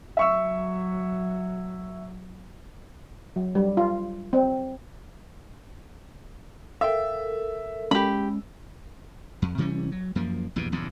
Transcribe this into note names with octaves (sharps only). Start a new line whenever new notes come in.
F#3 E5 C#6 E6
F#3
G3
F4
C4
A4 A#4 E5 F5 G5
G#3 C#4 G4 B5
F2
C3 E3 G3 C#4
F#3
F#2 F3 A#3
A#1 E2 G2 B2
A#1 E2 G2 C#3